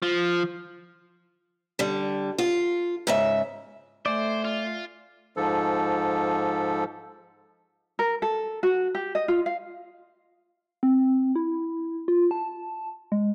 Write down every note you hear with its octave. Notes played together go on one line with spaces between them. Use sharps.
F3
D3 G3
F4
G#2 C#3 E5
A3 C5 D5 E5 G#5
F4
G#2 F3 A4
A#4
A4
F#4
G4
D#5
F4
F5
C4
E4
F4
A5
G#3